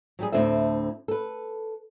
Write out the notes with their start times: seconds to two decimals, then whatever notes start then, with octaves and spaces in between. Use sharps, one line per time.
0.19 F#3 G3 G#4
0.32 D2 A2 C4 D4 A4 E5
1.08 A4 B4